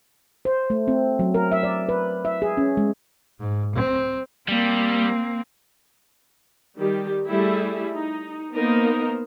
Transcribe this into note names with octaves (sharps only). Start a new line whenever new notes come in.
C5
A3
C4
F#3
A#4
E5
D5
B4
E5
G#4
C#4
G#3
G#2
C4
G3 A#3 C4
D#3 G3 G4
G3 A3 E4 G#4 E5
D#4
A#3 B3 D#4 A#4 C5